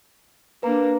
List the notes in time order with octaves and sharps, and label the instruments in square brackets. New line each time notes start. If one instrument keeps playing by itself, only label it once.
[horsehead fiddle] A#3 D4 [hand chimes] B4 A#5